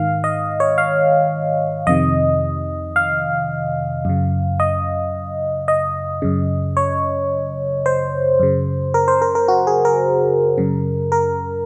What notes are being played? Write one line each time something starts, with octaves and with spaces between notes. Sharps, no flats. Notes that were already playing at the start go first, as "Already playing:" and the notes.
Already playing: G#2 D#3 F5
D#5
C#5
F5
F2 C3 D#3 D#5
F5
F#2 C#3
D#5
D#5
F#2 C#3
C#5
C5
F#2 C#3
A#4
C5
A#4
A#4
F#4
G#4
A#4
F#2 C#3
A#4